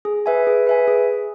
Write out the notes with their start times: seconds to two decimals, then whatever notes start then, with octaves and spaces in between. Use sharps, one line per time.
0.05 G#4
0.26 B4 E5 G#5
0.47 G#4
0.67 B4 E5 G#5
0.87 G#4